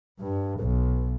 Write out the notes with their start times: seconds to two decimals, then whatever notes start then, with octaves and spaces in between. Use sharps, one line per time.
0.20 G2
0.59 B1